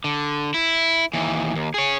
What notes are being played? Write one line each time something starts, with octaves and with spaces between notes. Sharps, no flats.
D3
E4
D#2 E3
D#2
G#4 C#5